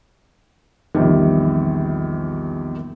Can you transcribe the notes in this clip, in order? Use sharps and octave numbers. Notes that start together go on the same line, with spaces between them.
A#1 E2 C3 D#3 G3